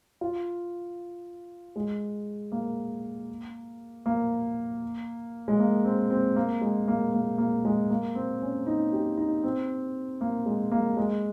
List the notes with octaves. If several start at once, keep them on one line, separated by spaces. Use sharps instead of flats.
F4
G#3
A#3
A#3
G#3
A#3
C4
C4
A#3
G#3
A#3
A#3
A#3
G#3
A#3
C4
C#4
D#4
G4
D#4
C4
A#3
G#3
A#3
G#3